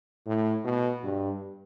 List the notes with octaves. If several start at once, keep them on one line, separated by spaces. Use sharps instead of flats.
A2
B2
G2